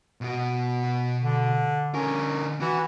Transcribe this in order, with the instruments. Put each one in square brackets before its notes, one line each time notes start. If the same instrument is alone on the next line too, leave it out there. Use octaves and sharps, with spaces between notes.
[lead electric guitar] B2 F#4
[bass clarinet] D3
[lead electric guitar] D3 A#4 [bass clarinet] C#4
[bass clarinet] E3 [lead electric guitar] F#4